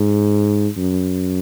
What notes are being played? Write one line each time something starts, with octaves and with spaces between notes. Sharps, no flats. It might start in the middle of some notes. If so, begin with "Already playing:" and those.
Already playing: G#2
F#2